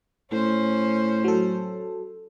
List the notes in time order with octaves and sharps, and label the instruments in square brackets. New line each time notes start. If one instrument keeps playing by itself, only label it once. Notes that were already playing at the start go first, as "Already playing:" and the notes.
[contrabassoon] A2 [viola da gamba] C#4 C5
[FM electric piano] F#3 A4